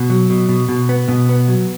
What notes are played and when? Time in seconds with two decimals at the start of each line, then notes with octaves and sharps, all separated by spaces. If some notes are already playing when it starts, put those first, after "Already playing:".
Already playing: B2
0.10 F#3
0.30 B2
0.49 B2
0.69 B2
0.89 B3
1.09 B2
1.29 B3
1.48 F#3